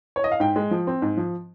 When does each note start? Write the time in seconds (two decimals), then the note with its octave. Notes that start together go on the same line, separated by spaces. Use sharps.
0.16 C#5
0.24 D#5
0.32 F5
0.40 G#2 G5
0.56 G#3
0.71 F3
0.87 C4
1.02 G#2
1.17 F3